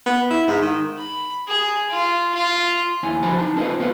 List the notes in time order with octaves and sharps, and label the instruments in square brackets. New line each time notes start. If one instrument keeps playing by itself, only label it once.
[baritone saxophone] B3
E4
G#2
D#3
[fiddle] B5
G#4
F4
F4
[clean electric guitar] D#2 E4 G#5
D3 F3 F#4 C5 A5 B5
D#4 A5
C#4 F4 A4 B4 C5 D#5
B3 F4 G4 A4 B4 C5